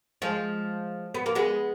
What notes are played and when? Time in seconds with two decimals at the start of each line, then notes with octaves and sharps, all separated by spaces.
0.22 F3 G#3
1.14 B3
1.26 A#3
1.35 G#3 B3